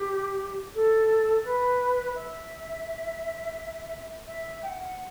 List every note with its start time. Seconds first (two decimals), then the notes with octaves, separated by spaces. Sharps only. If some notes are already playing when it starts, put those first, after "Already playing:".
Already playing: G4
0.74 A4
1.44 B4
2.15 E5
4.27 E5
4.62 G5
4.66 F#5